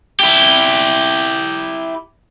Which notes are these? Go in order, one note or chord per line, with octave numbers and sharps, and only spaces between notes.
E4 G4